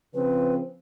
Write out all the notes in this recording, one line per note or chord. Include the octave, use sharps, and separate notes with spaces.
C#3 F3 C4 B4